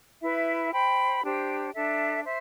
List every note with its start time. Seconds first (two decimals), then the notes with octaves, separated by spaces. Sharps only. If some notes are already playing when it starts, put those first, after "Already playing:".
0.22 E4 B4 E5
0.72 C5 G5 B5
1.23 D4 G4 C5
1.73 D4 A4 E5
2.24 C5 E5